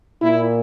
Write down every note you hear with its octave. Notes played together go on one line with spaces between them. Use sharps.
A#2 E4